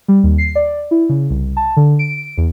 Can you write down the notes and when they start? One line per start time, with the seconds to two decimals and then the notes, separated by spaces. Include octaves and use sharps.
0.08 G3
0.23 D#2
0.38 C7
0.55 D5
0.91 E4
1.09 C#3
1.30 C2
1.57 A5
1.77 D3
1.99 D7
2.37 E2